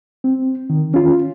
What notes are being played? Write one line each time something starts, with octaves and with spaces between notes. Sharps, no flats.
C4
D#3
C#4 F4